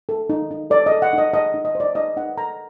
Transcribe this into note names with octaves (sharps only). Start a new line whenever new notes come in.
A4
D#4
D#4
A4 D5
D#5
A4
F#5
D#4
D#5
D#4 D#5
D#4
D#5
C5
D5
D#4 D#5
D#4 F#5
A4 A#5